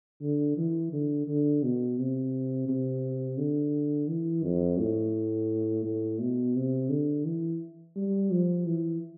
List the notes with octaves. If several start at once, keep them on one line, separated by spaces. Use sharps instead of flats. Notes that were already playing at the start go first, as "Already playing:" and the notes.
D3
E3
D3
D3
B2
C3
C3
D3
E3
F2
A2
A2
B2
C3
D3
E3
G3
F3
E3